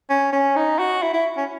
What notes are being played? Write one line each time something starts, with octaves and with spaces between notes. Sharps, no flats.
C#4
C#4
D#4
F#4
E4
E4
C#4